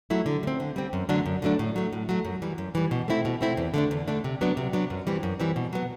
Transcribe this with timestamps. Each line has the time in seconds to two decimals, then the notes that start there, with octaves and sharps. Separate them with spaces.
0.10 F#3 A3 E4
0.26 D3
0.43 G3
0.47 C4
0.60 D3
0.76 G3 C4
0.93 F#2
1.09 D3 F#3 A3 D4
1.26 F#2
1.42 D3 F#3 A3 D4
1.59 A2
1.76 F#3 A3
1.93 A2
2.09 F#3 A3
2.25 F#2
2.42 E3 G3
2.58 F#2
2.75 E3 G3
2.91 B2
3.08 A3 C4 E4
3.25 B2
3.41 A3 C4 E4
3.57 E2
3.74 D3 A3 D4
3.91 E2
4.08 D3 A3 D4
4.24 C3
4.41 F#3 B3 D4
4.57 C3
4.73 F#3 B3 D4
4.90 F#2
5.07 E3 G3 C4
5.23 F#2
5.40 E3 G3 C4
5.56 B2
5.73 F#3 B3